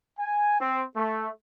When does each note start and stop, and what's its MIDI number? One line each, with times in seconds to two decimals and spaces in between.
0.18 0.59 80
0.60 0.83 60
0.96 1.29 57